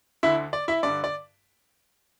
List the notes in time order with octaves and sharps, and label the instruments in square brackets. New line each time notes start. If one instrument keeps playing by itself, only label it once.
[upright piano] D2 D3 E4 E5
D5
E4 E5
G2 D3 D5
D5